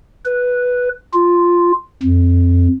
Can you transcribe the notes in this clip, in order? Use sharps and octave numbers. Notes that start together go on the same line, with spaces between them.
B4
F4
F2